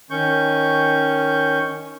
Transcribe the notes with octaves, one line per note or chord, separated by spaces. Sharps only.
D#3 C#4 C#6 G6